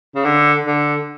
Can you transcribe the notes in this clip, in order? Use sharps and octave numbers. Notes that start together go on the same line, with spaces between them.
C#3
D3
D3